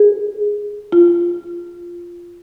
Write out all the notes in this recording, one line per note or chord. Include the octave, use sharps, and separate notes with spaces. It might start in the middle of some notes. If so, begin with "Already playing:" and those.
Already playing: G#4
F4